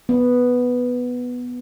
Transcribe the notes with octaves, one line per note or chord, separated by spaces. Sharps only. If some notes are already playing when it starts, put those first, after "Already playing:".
B3